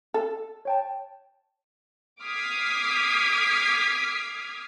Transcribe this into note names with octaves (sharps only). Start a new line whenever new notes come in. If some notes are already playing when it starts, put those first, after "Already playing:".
A4
C#5 G5 A5
D6 D#6 F6 G#6 B6 C7